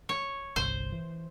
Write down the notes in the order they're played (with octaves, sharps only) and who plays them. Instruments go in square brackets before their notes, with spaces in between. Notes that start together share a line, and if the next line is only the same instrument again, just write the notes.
[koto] C#5
[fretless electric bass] G1 C2 [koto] C5
[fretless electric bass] E3